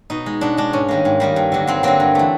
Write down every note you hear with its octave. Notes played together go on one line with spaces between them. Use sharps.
B2 D#4
G#3
B2 D4
G#3 D4
G#2 C#4
D#3 G3 A#3
G#2
D#3 G3 A#3
G2
D3 F#3 A#3
G2 C4
D3 F#3 A#3 C4
G2
E3 A3